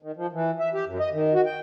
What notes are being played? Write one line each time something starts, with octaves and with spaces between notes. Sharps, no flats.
D#3
F3
E3
E5
G4
F#2
D#5
D#3
F#4
G5